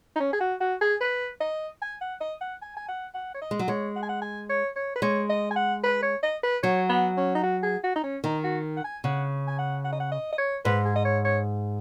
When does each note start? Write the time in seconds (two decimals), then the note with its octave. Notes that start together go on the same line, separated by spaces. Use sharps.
0.16 D#4
0.20 C#4
0.33 G#4
0.40 F#4
0.60 F#4
0.81 G#4
1.01 B4
1.40 D#5
1.82 G#5
2.01 F#5
2.21 D#5
2.41 F#5
2.62 G#5
2.76 G#5
2.88 F#5
3.14 F#5
3.34 C#5
3.41 D#5
3.51 G#3
3.59 F#3
3.68 G#3 C#5
3.96 F#5
4.02 G#5
4.09 F#5
4.21 G#5
4.49 C#5
4.76 C#5
4.95 B4
5.02 G#3 C#5
5.29 D#5
5.50 G#5
5.56 F#5
5.83 B4
6.02 C#5
6.23 D#5
6.43 B4
6.63 F#3 C#5
6.89 B3
7.17 C#4
7.35 D#4
7.43 F#4
7.63 G#4
7.84 F#4
7.95 D#4
8.03 C#4
8.24 D#3 D#4
8.44 F#4
8.77 F#5
8.84 G#5
9.04 C#3 F#5
9.47 G#5
9.58 F#5
9.84 F#5
9.92 D#5
10.00 F#5
10.11 D#5
10.32 D#5
10.38 C#5
10.64 G#2 B4
10.85 G#4
10.95 D#5
11.05 C#5
11.25 C#5